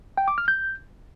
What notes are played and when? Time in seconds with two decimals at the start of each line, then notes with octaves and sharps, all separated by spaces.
0.17 G5
0.28 D6
0.38 F6
0.48 G6